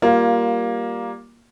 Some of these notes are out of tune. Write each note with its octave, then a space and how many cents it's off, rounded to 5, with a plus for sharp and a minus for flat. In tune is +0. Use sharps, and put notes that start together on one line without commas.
G3 +0 A#3 +10 F4 +0